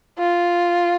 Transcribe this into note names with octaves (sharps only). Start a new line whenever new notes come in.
F4